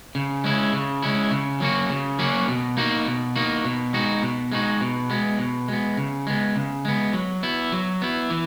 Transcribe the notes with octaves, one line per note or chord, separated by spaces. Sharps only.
C#3
G#3 C#4 E4
C#3
G#3 C#4 E4
C#3
F#3 A#3 C#4 F#4
C#3
F#3 A#3 C#4 F#4
B2
A#3 D#4 F#4
B2
A#3 D#4 F#4
B2
G#3 D#4 F#4
B2
G#3 D#4 F#4
B2
G#3 B3
B2
G#3 B3
C#3
G#3 B3
C#3
G#3 B3
F#3
B3 E4
F#3
B3 E4
E3